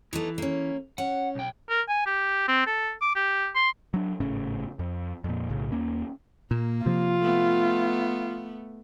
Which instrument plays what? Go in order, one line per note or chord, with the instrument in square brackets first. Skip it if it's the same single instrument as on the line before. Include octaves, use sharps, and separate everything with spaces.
[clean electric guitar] E3 [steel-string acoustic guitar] A3 B3 D#4
[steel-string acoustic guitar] A#3 C#4
[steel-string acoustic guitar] C#4 [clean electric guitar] F#5
[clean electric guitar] B1 G5
[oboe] A#4
G#5
G4
C4
A4
D6
G4
C6
[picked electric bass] F#3 D4
G#1 A2 C#3 C#4
F2
F2 A#2
B1 A2 C#3
D#2 A#3 C#4
[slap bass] A#2 [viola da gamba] A#3
[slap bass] C3 F3 [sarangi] F4
[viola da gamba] A3 B3